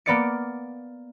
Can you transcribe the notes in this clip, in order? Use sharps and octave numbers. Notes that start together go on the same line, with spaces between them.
A#3 B3 D5 C#7